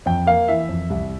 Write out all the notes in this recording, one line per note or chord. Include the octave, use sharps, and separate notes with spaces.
F2 G5
A#3 F5
E3 E5
F2
C2